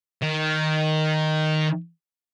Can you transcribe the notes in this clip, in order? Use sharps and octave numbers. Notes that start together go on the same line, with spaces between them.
D#3